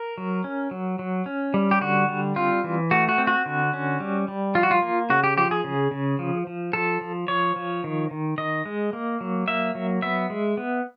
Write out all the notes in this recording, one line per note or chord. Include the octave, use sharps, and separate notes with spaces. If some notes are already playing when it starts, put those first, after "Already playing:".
Already playing: A#4
F#3
C#4
F#3
F#3
C#4
G3
G4
D3 F#4
G3
C4 F4
E3
A3 F#4
F#4
C4
F#4
D3
C#4
G3
G3
F3 F4
F#4
F4
A#3
C#3 F#4
G4
F3 G4
G#4
C#3
C#3
F3
F3
F3 A4
F3
F3 C#5
F3
D#3
D#3
D#3 D#5
G#3
A#3
F#3
A#3 E5
F#3
B3 E5
G#3
B3